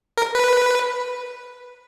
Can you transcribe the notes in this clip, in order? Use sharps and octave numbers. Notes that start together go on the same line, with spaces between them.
A#4
B4